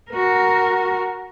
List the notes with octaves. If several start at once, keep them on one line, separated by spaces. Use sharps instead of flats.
F#4 A#4